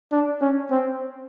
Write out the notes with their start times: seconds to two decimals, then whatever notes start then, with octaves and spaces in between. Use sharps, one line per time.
0.12 D4
0.41 C#4
0.71 C4